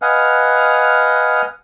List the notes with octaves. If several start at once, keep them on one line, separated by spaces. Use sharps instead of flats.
B4 D#5 F5 F#5 G#5 F6